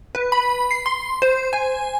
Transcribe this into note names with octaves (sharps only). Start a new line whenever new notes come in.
B4
B5
C7
C6
C5
G#5